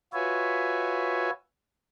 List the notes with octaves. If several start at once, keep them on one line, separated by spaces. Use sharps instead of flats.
F4 F#4 B4 C#5 E5 G#5